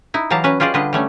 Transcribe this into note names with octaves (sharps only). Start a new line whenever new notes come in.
D#4 E4
E3 F#3 G4 F5 A5 A#5
C#4 F#4 B4
C#4 F4 G4 G#4 D5 D#5
D3 G3 F4 B4 D#5
G3 A3 C#4